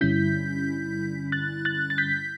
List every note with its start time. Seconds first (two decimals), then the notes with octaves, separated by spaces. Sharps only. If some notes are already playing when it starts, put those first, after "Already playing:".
0.01 G2 D3 G3 C#4 E4 G6 B6
1.32 F#6 A6
1.65 F#6 A6
1.90 A6
1.98 G6 B6